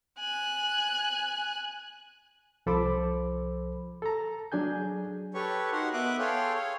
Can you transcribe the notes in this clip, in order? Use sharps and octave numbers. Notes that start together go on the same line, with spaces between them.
G#5 F#6
C2 F3 A4 C5 B5 D6
A4 A#5
F#3 D4 G#4 G#5 G6
G4 A4 B4 C#5 C#6
D#4 F#4 A#4 F#5 C6
B3 E5 D6 D#6 F#6
G#4 A4 C#5 F5 G5 C6
G#4 C#5 F5